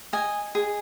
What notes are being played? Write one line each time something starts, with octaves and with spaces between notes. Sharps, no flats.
D#5 G#5
G#4